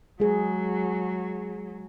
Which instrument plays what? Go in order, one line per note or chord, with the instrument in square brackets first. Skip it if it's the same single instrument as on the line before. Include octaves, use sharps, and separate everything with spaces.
[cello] F#3 [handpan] G#3 G#4